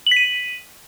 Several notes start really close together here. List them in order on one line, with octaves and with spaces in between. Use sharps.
F#7 B6 D#7